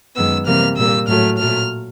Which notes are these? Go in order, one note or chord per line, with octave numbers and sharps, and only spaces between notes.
F#2 D#3 G#3 B3 E6
C3 E3 G3 A#3 F6
A#2 G3 A#3 E6
A2 F#3 A3 F6
A#2 F#3 A3 F6